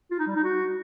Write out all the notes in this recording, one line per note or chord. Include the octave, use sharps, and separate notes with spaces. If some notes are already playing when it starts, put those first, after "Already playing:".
F4
D#4
G3
D#4
F#4